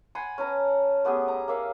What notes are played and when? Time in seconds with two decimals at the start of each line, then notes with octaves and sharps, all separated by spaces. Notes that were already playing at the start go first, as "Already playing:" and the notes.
0.15 F#5 G#5 B5 C6
0.38 C#4 B4 A5 A#5
1.05 A3 B3 G4 G#4
1.28 A#5
1.48 A#3 C#5 E5 F5